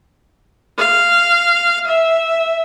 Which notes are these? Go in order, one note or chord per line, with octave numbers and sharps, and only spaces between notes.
F5
E5